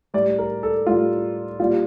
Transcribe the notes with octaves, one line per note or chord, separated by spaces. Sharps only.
A2 G3 D5
A#4
A4
A2 G3 F4
A#2 G3 F4